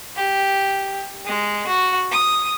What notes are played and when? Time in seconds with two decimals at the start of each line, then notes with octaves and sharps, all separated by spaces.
0.17 G4
1.26 G#3
1.67 F#4
2.11 D#6